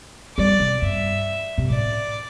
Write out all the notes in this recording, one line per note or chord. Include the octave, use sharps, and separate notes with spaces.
G3 D5
C3
G2 E5
C3
A2 D5